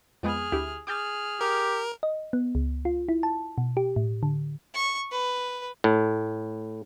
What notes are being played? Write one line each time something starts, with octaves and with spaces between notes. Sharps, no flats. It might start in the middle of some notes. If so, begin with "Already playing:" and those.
F2 G#3 B3 G#4 F6
D2 E4 G4
G#4 D6 F6 G6 A6
G4 A#4
D#5
B3
C#2
F4
E4
A5
B2
G4
A2
D3
C#6
B4
A2